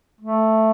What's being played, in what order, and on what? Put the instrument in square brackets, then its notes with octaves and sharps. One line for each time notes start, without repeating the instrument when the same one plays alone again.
[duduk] A3